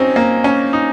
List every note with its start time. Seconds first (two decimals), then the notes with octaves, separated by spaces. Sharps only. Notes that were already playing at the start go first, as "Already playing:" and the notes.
Already playing: F#3 C4 C#4 D#4
0.16 A#3
0.44 C#4
0.73 D#4